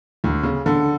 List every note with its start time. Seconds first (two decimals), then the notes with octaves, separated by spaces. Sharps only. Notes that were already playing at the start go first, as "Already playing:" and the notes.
0.24 D2
0.43 C#3
0.66 D3